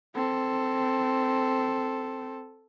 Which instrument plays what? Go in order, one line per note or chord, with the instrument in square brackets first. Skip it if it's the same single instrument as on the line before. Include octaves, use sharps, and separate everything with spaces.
[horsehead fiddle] C4 [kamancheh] A4